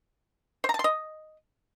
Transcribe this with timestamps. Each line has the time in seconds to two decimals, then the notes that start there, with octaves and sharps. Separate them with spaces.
0.64 C5
0.69 A#5
0.74 A5
0.79 C6
0.84 D#5